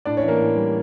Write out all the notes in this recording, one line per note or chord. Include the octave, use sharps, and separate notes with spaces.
A2 D4 D5
C#4 C#5
E3
A#3 A#4
A2
G3